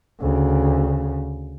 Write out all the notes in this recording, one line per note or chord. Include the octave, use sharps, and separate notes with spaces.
D2 C#3